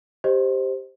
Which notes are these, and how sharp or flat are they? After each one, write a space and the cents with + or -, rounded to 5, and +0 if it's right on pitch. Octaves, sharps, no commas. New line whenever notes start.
G4 +0 C5 +0 D#5 +0